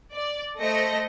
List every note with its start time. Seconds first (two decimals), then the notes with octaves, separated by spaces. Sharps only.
0.13 D5
0.59 A3 C5 D#5 A#6 C#7